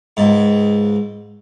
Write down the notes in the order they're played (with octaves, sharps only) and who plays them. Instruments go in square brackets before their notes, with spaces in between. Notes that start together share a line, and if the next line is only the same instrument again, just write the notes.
[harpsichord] C#2 G#2